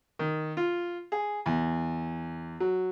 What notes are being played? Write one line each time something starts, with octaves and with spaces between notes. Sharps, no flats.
D#3
F4
G#4
E2
F#3